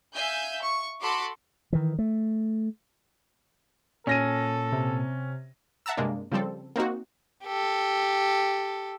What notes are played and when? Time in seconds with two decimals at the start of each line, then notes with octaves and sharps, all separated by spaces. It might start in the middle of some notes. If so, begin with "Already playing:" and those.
0.14 E5 F5 G#5 G6
0.62 C#6
1.01 F#4 A4 B5 C6 D6
1.73 D#3 E3
1.99 A3
4.07 A#2 C#4 A4 A#6 D#7
4.72 C3
5.86 E5 F#5 A5 A#5 E6
5.97 G2 C3 G#3 A#3 D4
6.32 C#3 F3 G3 C4 A4
6.76 A#3 C4 D#4 F#4
7.45 G4 A4